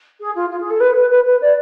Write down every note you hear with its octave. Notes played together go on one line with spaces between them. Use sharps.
G#4
F4
F4
G#4
A4
B4
B4
B4
B4
D5